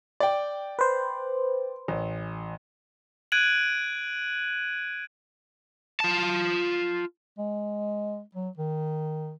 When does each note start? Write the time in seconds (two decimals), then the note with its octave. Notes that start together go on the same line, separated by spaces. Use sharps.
0.20 D5 G5
0.79 B4 C5
1.88 A1
3.32 F#6 G#6 D7 D#7 F#7
6.00 F4 A5
7.38 G#3
8.34 F#3
8.57 D#3